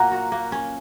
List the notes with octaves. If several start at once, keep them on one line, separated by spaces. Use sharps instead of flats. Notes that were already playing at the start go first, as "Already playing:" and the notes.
Already playing: A#2 F#3 A#3 F#5 A#5
F#4
A#3
C#4